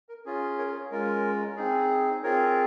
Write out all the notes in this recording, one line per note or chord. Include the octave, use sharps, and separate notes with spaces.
A#4
C#4 F4 G#4
A#4 C#5
G#4
G#3 C#4 F4 A#4
C4 D#4 G#4
C4 F4 G#4 A#4 C#5